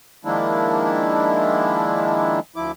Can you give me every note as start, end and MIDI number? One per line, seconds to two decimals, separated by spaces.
0.25 2.40 51
0.25 2.40 53
0.25 2.40 56
0.25 2.40 58
0.25 2.40 62
0.25 2.40 64
2.56 2.72 38
2.56 2.72 53
2.56 2.72 64
2.56 2.72 86